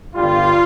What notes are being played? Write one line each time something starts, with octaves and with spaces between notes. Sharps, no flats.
G1 G2 G3 F4